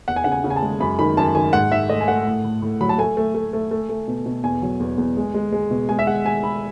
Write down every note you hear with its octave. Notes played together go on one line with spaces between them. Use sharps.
E2 F#5
G#5
C#3 F#5
G#5
C#3
G#5
A5
G#3
F#2 B5
D#3 B5
F#2 A5
D#3 G#5
G#2 F#5
G#2 E5
A3 D#5
G#5
A3 F#5
A2
A2
A2
F#3 B5
A5
A3 G#5
A3
A3
A3
A3
A3
B2
B2
E2 G#5
F#3
E2
E2
G#3
G#3
G#3
B2
G#3 G#5
E5
G#3 F#5
G#3 G#5
G#3 B5